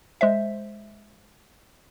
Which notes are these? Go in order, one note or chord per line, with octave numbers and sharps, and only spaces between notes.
G#3 C5 E5